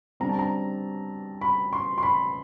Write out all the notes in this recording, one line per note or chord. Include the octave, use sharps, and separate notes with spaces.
D3 G3 C4 A#5
A5
A#5
B5
C6
C6
B5